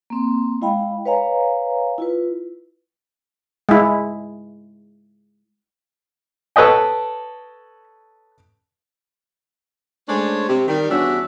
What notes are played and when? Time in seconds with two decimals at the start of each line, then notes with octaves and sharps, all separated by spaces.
0.10 A#3 C4 C6
0.61 G#3 E4 D#5 F5 G5 B5
1.06 B4 C#5 D#5 F5 G#5 A#5
1.98 E4 F4 B4
3.69 G#3 E4
6.56 A4 B4 C#5 D#5 G5
10.09 G#3 A3 C#4 D4 C5 C#5
10.48 C3
10.68 D#3 G3 G4
10.90 E2 G2 C#4 D4 F#4 E5